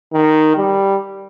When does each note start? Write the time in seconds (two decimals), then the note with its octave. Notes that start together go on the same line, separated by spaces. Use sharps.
0.13 D#3
0.57 G3